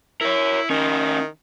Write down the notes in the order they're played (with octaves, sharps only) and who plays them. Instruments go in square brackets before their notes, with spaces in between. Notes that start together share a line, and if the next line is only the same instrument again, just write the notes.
[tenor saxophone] E4 [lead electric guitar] A#4 C#5
[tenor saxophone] D#3 [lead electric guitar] C#4 E4